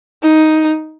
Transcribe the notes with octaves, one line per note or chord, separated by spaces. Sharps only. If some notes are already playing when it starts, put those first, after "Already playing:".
D#4